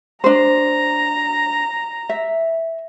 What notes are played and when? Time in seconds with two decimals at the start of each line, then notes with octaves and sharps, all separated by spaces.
0.24 D4 C5 A#5
2.09 E5